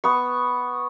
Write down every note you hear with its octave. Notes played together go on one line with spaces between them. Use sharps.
B3 C#6